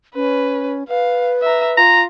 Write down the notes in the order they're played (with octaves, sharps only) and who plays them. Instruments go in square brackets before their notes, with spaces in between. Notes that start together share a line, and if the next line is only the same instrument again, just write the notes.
[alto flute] C#4 [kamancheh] B4
[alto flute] B4 [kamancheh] F5
[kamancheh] E5 A#5
[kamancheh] F4 [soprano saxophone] A#5